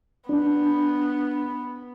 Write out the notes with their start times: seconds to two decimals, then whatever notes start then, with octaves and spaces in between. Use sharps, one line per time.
0.29 B3 D4